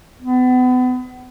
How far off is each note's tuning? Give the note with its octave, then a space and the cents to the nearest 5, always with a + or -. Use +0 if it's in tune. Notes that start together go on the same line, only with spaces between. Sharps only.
B3 +35